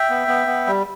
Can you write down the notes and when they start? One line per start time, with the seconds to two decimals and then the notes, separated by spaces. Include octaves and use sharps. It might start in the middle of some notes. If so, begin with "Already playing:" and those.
Already playing: E5 G5
0.10 B3
0.28 B3
0.47 B3
0.67 G3